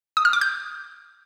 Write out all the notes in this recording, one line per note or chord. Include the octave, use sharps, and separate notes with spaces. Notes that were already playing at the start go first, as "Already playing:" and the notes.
D#6
F6
D6
G6